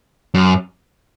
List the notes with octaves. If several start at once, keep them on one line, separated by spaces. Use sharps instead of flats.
F#2